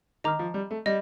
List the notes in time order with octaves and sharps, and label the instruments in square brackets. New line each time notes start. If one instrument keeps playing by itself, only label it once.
[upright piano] D#3 [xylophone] D#5 A#5 D6 F6
[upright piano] F3
G3
A3
[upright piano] G3 [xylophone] D#5